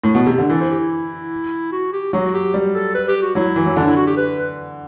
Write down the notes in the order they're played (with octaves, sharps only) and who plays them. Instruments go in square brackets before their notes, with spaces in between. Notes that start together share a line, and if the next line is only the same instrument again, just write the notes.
[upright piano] A2
B2
C3
D3
[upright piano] E3 [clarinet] A4
[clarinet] C5
G4
E4
F#4
G4
[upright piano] F#3 [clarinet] F#4
[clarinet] G4
[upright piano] G3
[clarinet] A4
B4
G4
F#4
[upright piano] F#3 [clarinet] E4
[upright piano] E3
F#3
[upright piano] D3 [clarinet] D4
[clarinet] E4
F#4
G4
B4